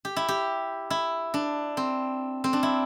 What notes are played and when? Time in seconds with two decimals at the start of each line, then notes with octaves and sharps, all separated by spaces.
0.05 G4
0.16 E4
0.28 G4
0.90 E4
1.34 D4
1.77 C4
2.44 C4
2.53 D4
2.63 E4